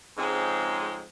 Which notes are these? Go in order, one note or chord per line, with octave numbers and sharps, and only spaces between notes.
F2 G#2 C#3 G#3 C4